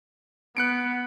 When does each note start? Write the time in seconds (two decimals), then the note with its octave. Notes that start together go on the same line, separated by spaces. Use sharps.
0.57 B3 F#6 C#7 D7